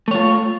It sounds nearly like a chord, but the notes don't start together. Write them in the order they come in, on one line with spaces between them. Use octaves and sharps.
A3 C#5 F4